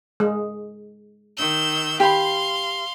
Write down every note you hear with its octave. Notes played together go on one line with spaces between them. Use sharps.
G#3
D#3 E6 G6
G4 F5 B5 C6